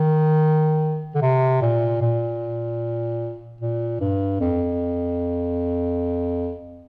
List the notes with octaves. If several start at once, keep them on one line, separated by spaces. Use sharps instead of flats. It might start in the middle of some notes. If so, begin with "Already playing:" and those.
Already playing: D#3
D3
C3
A#2
A#2
A#2
G2
F2